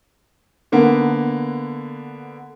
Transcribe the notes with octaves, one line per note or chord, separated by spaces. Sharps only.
D3 A#3 B3